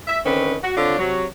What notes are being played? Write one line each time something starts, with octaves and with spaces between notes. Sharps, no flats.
E5
D3 D#3 C4 C#4 B4
F#4
D3 C4 D4 F4 C#5
C3 F#3